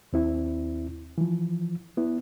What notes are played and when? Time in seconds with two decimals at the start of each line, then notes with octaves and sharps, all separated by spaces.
0.13 D#2 C4 E4
1.18 E3 F3
1.97 B3 E4